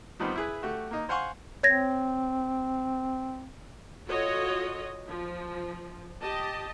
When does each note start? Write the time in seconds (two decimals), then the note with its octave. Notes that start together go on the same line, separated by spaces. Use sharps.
0.19 D#3 F3 G3 B3 C4
0.35 E4 G#4 B4
0.62 A3 F#4 G4
0.91 A#3 D#4
1.09 C5 F5 F#5 G#5 C6 C#6
1.63 C4 C#5 G#6 A#6
4.08 F4 F#4 A4 C#5 D#5
5.08 F3
6.21 G4 D#5 A5